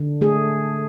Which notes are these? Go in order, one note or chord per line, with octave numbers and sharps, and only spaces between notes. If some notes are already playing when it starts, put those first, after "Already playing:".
Already playing: D3
A3 G#4